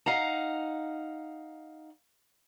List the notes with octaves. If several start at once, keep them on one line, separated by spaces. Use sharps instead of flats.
D#4 F5 F#5 A#5